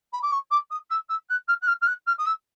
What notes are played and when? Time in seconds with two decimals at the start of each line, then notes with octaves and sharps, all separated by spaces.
0.12 B5
0.22 D6
0.31 C#6
0.50 D6
0.70 D#6
0.90 E6
1.09 E6
1.29 F#6
1.48 F6
1.61 F#6
1.67 F6
1.81 F6
1.86 F#6
2.06 F6
2.18 D#6
2.25 E6